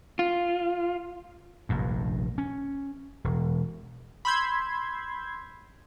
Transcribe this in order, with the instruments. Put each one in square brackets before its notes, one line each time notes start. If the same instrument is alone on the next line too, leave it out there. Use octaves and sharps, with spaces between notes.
[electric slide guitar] F4
[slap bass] F1 A#1 G2
C#4
E1
[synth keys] B5 C6 E6 G6 G#6